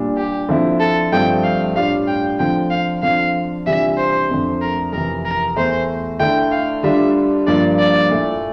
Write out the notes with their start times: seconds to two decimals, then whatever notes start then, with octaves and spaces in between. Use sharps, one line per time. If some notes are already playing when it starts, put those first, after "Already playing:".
Already playing: A#2 G3 D4
0.17 G4
0.49 D3 F3 C4 E4
0.80 A4
1.12 G2 F3 A3 C4 G5
1.44 F5
1.76 A2 G3 D4 F4 F5
2.08 G5
2.39 D3 F3 C4 G5
2.70 F5
3.02 D3 F3 C4 F5
3.66 C3 E3 G3 D4 F4 E5
3.97 C5
4.30 F2 D3 A3 C4
4.61 A#4
4.93 F2 C3 E3 A#4
5.25 A#4
5.56 E2 E3 A3 C5
6.20 D3 A3 E4 G5
6.52 F5
6.83 D3 G3 D4 F4 E5
7.47 G2 F3 A#3 D4 D5
7.79 D5
8.10 A#2 A3 E4